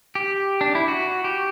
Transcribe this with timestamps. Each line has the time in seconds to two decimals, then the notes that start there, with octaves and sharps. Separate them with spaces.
0.15 G4
0.61 D4
0.75 E4
0.88 F#4
1.24 G4